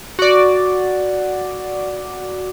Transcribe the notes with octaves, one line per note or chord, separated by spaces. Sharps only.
F#4 D5